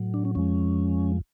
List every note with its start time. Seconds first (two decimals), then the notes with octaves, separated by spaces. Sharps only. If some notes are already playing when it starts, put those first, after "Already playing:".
Already playing: A2 F#3
0.14 D4
0.25 C#4
0.35 F2 F3 G#3 C#4